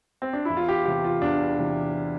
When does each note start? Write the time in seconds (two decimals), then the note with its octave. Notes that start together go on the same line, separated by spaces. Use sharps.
0.22 C4
0.33 D4
0.45 E2 E4
0.57 F4
0.69 G4
0.85 C3 E3 G4
1.04 F4
1.22 E2 D4
1.58 C3 E3